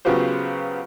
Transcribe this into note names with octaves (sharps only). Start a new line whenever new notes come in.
C#3 F#3 B3 F4 G4 C5